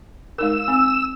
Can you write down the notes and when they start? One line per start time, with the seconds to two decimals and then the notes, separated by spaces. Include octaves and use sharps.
0.38 G#3 D#4 A#4 E6
0.68 C4